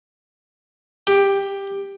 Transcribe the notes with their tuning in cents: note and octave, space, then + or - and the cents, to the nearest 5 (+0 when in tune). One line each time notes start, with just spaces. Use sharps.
G4 +10